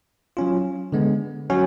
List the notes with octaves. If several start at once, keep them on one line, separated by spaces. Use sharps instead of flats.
F#3 C#4 F4
D3 G#3 B3
F#3 C#4 F#4